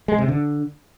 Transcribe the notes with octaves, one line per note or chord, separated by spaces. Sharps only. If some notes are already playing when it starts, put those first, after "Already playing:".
G#3
C3
D3